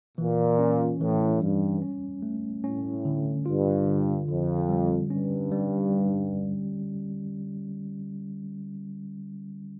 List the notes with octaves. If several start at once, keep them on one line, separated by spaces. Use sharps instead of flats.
A#2 E3
C#4
A2 E3
G2 G3
C#4
A3
A2 C#4
D3
G2 F4
D3
F2 D3
G3
G2 C#4
G3